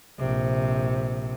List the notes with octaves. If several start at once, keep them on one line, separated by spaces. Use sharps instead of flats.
A#1 C3